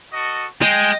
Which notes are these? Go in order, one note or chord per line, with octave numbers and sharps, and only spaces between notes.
F#4 A4 D#5
G#3 D#5 G5